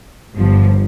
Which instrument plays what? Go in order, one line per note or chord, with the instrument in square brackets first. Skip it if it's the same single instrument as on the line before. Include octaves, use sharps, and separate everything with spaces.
[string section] G1 G2 F3